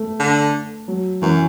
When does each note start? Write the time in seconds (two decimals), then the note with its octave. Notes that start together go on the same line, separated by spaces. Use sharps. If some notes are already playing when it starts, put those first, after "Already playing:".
Already playing: A3
0.19 D3
0.88 F#3
1.22 F#2 E3